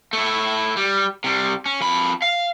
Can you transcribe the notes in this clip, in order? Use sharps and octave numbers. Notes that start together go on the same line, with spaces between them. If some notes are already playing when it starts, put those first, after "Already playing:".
A3 E4
G3
C3 G3
C#4
F2 B5
F5